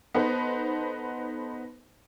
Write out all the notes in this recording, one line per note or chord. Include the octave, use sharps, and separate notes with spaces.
B3 D#4 A4 B4 C5